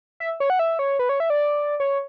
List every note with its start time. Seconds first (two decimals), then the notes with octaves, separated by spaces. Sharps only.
0.20 E5
0.40 C#5
0.50 F#5
0.59 E5
0.79 C#5
0.99 B4
1.09 C#5
1.20 E5
1.30 D5
1.80 C#5